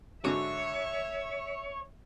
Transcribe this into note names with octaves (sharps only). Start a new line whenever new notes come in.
G#2 D3 F#4 C#5 E5